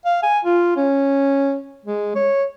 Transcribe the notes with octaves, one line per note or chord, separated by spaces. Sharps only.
F5
G#5
F4
C#4
G#3
C#5